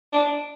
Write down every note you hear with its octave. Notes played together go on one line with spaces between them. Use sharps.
D4